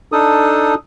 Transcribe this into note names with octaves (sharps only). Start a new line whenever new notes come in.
D4 D#4 A4 D#6